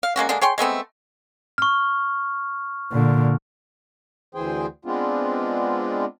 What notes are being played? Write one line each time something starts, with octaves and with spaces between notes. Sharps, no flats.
F5
G#3 A#3 C#4 F#4
D3 G#3 A#3 D4
G#4 C#5 G5 C6
G#3 A3 B3 C4
C#6 F6
A#2 D3
D2 E3 G#4 C5 G5
G#3 B3 C4 D4 F4